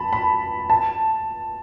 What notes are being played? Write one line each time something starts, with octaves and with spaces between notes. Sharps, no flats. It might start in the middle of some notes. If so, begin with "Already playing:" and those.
Already playing: A5 B5
B5
A5